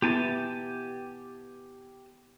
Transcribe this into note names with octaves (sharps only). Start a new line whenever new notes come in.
B3 E4 G4 G#5 A5